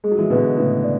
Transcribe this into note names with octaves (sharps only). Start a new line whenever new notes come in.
G#3 G#4
F#3
E3 G#3
B2 D3 B4
A2 C#3 B4
D5